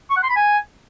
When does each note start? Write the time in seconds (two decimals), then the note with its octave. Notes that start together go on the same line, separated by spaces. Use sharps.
0.10 C#6
0.17 F#5
0.23 C6
0.30 B5
0.36 G#5